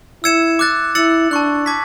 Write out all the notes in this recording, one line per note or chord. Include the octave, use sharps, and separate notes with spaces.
E4 E6 G#6 C#7 E7
D6 F#6 A6
E4 E6 A6 C#7 F#7
D4 A5 C#6 F#6
A5 D6 G#6 B6